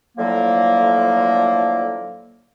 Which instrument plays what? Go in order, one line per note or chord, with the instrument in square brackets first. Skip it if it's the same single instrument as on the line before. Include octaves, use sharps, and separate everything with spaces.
[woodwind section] A2 D3 F3 F#3 A#3